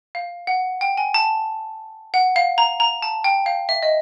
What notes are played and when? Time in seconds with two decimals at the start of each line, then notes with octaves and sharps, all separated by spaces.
0.15 F5
0.47 F#5
0.81 G5
0.97 G#5
1.14 A5
2.14 F#5
2.36 F5
2.58 A#5
2.80 A#5
3.02 A5
3.24 G5
3.46 F5
3.69 E5
3.83 D#5